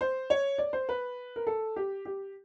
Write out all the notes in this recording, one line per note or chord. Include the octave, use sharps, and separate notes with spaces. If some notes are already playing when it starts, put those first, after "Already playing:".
C5
C#5
D5
C5
B4
A#4
A4
G4
G4